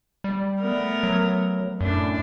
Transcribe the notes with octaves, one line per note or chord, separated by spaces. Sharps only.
G3
A3 B3 A#4
F#3
F#2 A2 D4